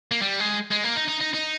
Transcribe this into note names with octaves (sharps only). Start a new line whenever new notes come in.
A#3
G3
G#3
G#3
A#3
D#4
D#4
D#4
D#4